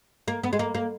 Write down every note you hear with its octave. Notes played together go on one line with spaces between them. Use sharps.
A#3
B3
G#3
A#3
A#3